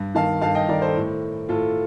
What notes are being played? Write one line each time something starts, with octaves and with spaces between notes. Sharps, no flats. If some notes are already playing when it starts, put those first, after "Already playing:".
Already playing: G2
D#3 F5 A5
G2 F5 A5
D#5 G5
D#3 A#4 D5
A4 C5
A2
A2 F4 A4